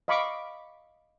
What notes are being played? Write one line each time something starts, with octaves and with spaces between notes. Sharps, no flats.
D#5 F5 B5 C#6 D6